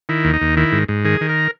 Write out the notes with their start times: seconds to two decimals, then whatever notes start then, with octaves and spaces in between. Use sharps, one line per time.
0.09 D#3 E4
0.24 D#2
0.33 D#4
0.41 D#2
0.57 D#3 E4
0.72 G#2
0.88 G#2
1.05 D#3 G#4
1.21 D#3
1.29 A#4